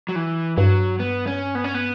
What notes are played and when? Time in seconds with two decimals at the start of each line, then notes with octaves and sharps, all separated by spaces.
0.09 F#3
0.16 E3
0.57 G2 F#3
0.99 B3
1.27 C#4
1.55 B3
1.64 C#4
1.75 B3